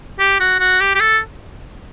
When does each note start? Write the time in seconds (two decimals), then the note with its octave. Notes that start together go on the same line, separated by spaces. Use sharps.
0.19 G4
0.40 F#4
0.60 F#4
0.80 G4
0.95 G4
1.00 A4